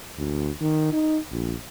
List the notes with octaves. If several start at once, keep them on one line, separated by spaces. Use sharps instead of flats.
D2
D#3
D#4
A#1